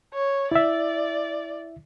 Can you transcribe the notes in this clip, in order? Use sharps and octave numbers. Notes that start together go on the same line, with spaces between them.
C#5
E4 D5 E5